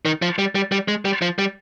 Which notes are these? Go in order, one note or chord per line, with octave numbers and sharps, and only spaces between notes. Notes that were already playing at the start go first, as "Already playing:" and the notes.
D#3
F3
G3
G3
G3
G#3
G3
F3
G3